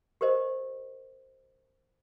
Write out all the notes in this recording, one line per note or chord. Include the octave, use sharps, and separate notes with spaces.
G4 A#4 C5 D#5